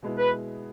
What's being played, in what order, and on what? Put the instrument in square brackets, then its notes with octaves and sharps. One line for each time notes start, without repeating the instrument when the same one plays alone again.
[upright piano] B2 G#3 B3 E4
[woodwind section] B4